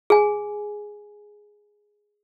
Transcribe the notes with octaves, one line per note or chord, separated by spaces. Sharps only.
G#4 G#5